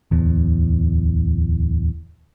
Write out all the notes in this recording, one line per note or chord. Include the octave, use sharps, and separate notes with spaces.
D1 E2